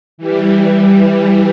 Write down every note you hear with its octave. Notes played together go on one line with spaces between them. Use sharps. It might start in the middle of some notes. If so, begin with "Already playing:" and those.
E3 G3